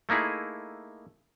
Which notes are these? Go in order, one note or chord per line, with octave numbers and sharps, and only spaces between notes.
A3 A#3 D#4 E4 G#4